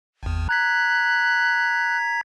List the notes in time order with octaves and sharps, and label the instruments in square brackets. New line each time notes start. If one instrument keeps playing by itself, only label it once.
[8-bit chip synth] G#1 E2
[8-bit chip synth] A#5 G#6 B6 [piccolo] F#6